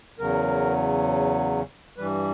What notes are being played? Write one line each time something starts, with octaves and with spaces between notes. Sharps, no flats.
E2 C#3 F#3 A#4
G2 E3 G3 B4